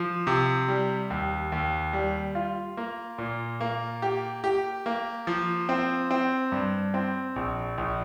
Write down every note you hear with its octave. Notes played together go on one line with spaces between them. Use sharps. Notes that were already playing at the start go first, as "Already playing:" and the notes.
Already playing: F3
C3
G3
D#2
D#2
G3
F4
A#3
A#2
A#3
G4
G4
A#3
F3
C4
C4
G2
C4
A#1
A#1